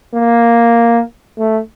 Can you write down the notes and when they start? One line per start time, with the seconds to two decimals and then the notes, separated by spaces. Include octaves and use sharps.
0.14 A#3
1.38 A3